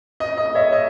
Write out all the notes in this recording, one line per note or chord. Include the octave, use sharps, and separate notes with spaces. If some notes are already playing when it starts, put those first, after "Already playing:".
D#5
D#5
C#5 E5
D#5